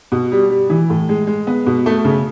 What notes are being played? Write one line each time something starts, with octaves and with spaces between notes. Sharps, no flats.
B2
G3
G3
E3
A2
G#3
G#3
B3
B2
A3
C#3